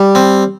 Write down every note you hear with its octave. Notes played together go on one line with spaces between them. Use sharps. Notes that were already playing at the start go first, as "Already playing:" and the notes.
Already playing: G3
C4